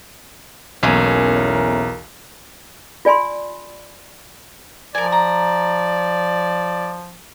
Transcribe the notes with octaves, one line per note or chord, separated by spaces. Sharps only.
B1 E2 A3 A#3 C#4 A#4
F4 D5 G#5 B5 C6
F3 A#4 D5 G#5
A#5